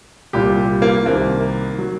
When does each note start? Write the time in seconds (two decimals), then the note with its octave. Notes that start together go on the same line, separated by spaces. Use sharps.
0.33 C2 A#2 G3 G4
0.82 A#3
1.06 C2 C3 D#3 A#3
1.78 F#3